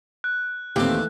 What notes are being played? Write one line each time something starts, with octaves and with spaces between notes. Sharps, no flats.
F#6
D#2 E3 A3 C4 G4 A5